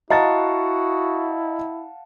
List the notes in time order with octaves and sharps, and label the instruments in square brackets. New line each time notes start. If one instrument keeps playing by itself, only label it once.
[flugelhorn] E4 [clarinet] F#4 [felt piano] D#5 A#5 A6 [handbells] F5 F#5 A5